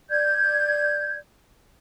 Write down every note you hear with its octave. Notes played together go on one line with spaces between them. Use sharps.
D5 G6 G#6